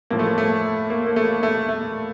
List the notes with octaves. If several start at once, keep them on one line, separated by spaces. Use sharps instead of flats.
A2 F3 A#3
A3
A3
A#3
A#3
A3
A3
A3